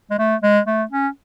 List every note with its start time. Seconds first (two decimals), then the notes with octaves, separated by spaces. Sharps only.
0.10 G#3
0.19 A3
0.43 G#3
0.66 A3
0.91 C#4